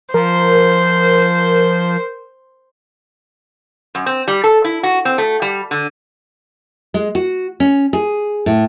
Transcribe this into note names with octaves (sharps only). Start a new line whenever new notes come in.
F3 A#4 C5
F#2
C4
G3
A4
E4
F#4
C4
A3
G3
D3
G#3
F#4
C#4
G#4
A2